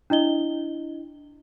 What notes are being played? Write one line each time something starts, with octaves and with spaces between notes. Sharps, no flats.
D4 E4 D#5 G7